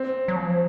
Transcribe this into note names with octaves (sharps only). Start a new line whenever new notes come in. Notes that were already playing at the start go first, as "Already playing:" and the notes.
Already playing: C4
F#3
F3